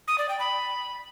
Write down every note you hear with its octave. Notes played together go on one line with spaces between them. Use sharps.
D#6
D5
G5
B5